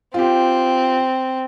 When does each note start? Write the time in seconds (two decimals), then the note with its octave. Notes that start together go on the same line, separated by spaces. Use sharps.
0.14 C4 F4 G4